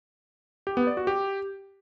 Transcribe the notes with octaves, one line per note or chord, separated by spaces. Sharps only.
G4
B3
D5
F#4
G4